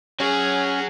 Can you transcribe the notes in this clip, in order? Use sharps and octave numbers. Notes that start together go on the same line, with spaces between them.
F#3 C#4 F#4 G#4